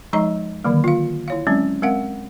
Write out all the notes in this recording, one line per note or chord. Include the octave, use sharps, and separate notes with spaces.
F3 G#3 D#4 D#5 A#5
D3 D#3 F#3 A#3
F4 F5
E4 C#5 F5
F#3 G#3 C4 C#4
G#3 C4 A#4 F5 F#5